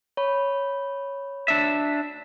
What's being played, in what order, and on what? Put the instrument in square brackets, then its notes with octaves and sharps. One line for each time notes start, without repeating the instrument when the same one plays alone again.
[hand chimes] C#5 B5
[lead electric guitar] D4 E5